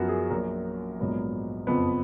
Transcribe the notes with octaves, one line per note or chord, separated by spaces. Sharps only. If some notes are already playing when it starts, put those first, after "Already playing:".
Already playing: F#2 F3 B3 F#4 A#4
G#4
A#1 A#2 F#3 A#4
A#1 G#2 F#3 B3
F#1 F2 F3 B3 B4